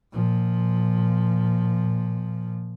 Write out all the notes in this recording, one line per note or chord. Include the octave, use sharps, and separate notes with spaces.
A#2 F3